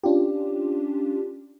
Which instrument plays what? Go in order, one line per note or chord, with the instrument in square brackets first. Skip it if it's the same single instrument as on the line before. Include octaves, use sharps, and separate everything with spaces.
[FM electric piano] C#4 D4 F4 G4